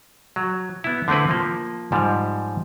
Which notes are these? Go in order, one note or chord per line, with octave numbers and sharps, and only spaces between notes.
F#3
B3 E4
D3 A3 C4 E4 B4
F3 A#3
G#2 F3 G3